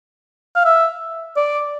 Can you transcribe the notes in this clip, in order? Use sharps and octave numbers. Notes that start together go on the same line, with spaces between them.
F5
E5
D5